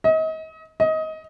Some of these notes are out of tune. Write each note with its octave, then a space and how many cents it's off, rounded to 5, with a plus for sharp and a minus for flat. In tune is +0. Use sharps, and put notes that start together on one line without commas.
D#5 +35
D#5 +20